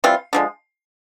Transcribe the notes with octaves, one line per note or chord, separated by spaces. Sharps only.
E3 G3 C4 F4
D3 F3 G#3